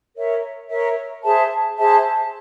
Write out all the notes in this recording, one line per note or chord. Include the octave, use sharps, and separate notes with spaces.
A#4 C#5 E5
A#4 C#5 E5
G#4 C5 E5 A5
G#4 C5 E5 A5